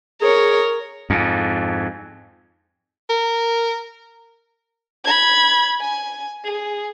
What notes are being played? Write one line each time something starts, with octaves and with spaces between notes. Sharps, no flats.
G#4 A#4 C#5
F2 G#2
A#4
B5 G#6
G#5
G#4